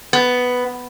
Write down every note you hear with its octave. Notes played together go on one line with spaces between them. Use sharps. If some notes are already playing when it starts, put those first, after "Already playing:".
B3